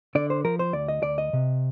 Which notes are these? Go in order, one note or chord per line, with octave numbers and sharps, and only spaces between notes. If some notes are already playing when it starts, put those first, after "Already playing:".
D3 D5
C5
F3 A#4
C5
D2 D5
D#5
D2 D5
D#5
C3